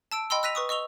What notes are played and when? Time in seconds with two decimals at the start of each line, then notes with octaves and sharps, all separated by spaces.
0.12 A5 E6 D7
0.30 D#5 G5 B5 C6 E6
0.43 E6 F#6 A#6 B6 D#7 F7
0.55 B4 C#6 D#6
0.69 D#5 C#6 E6 F7 G7